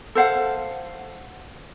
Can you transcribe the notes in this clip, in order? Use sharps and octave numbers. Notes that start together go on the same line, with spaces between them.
A4 C5 F5 F#5